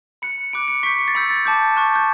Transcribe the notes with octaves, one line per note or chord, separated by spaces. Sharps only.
B5 F#6 C#7
B5 D6 F#6 D7
C#7
C#6 G6 B6
C#7
A6
B5 E6 G6 B6
A6
A5 D6 G6
A5 C#6 F#6
G6